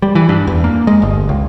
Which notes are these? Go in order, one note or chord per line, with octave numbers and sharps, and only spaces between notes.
G3
E3
G2
E2
A#3
G#3
G1
C#2